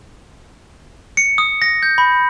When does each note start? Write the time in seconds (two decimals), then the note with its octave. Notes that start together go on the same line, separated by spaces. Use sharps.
1.17 C#7
1.38 D#6
1.62 A#6
1.83 G6
1.98 B5